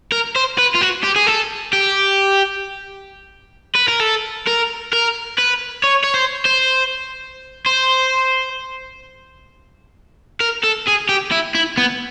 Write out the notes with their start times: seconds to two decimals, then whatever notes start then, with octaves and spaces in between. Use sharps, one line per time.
0.12 A#4
0.36 C5
0.58 B4
0.74 F4
0.81 F#4
1.03 G4
1.16 G#4
1.27 A4
1.73 G4
3.75 B4
3.89 A#4
4.00 A4
4.47 A#4
4.93 A#4
5.38 B4
5.84 C#5
6.04 C#5
6.14 C5
6.45 C5
7.66 C5
10.41 A#4
10.63 A4
10.87 G#4
11.09 G4
11.32 E4
11.55 E4
11.78 B3